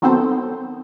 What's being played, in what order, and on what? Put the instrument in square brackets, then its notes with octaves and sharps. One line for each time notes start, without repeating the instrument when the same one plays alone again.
[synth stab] D#3 F#3 B3 C4 A4 C5